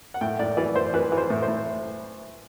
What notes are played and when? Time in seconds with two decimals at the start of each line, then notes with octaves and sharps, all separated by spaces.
0.14 F#5
0.21 A2 G5
0.39 A2 D5
0.57 E3 D5
0.75 E3 C5
0.94 E3 B4
1.12 E3
1.18 C5
1.30 A2
1.42 C5
1.48 A2